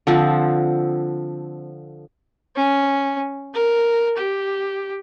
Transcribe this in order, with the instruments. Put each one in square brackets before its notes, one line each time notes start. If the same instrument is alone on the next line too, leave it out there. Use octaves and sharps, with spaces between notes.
[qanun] D3 F3 C4
[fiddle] C#4
A#4
G4